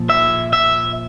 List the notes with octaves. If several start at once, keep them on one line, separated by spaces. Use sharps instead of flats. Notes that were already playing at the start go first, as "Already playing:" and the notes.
Already playing: A#2 F3
E5
E5